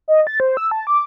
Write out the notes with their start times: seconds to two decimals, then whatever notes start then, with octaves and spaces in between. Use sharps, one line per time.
0.08 D#5
0.27 A6
0.40 C5
0.57 E6
0.71 A5
0.87 D6